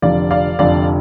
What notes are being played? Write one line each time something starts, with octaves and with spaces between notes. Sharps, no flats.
F1 F2 D3 D5 F5
D5 F5
F1 F2 D3 D5 F5